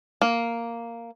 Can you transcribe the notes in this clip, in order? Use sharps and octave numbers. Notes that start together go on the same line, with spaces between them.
A#3